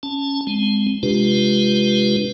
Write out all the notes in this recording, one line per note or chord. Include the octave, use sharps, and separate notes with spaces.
C#4 A5
G#3 C4
C3 G#3 D4 F4 G4 B4